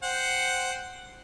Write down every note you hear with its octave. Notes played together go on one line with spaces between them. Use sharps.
C5 F#5 G5